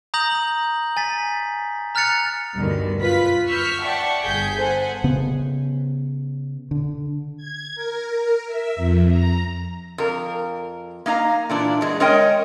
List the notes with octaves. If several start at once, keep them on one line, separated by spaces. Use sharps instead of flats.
A#5 D#6 G6 A#6 F#7
D#6 F#7
G#5 A6 B6
A#5 F6 F#6 A6 C#7 F7
D2 G2 B2 D3 D#3
F#2 F4 B4 B5 B6
C#6 E6 F6 G6 B6
D5 E5 F#5 G5 A5 C#6
G1 G#4 G6 G#6 B6
A4 C5 F#5 G#5
C#3 B3
D3
G#6
A#4
E5
F2
A#5
F2 A#4
A#3 D#4 F5 A#5
A#2 E3 D4
E2 G#3
G#3 C#4 A#4 C#5 D#5 G5